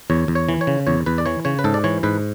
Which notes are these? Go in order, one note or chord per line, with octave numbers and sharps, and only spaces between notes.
E2 C#5
E2
C#5
E3
C#5
C#3
E2 C#5
E2 B4
D5
E3 C#5
C#3 C#5
B4
G#2 A4
D5
E3 C#5
G#2 B4